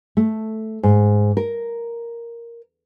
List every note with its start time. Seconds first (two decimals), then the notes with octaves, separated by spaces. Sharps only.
0.17 A3
0.83 G#2
1.37 A#4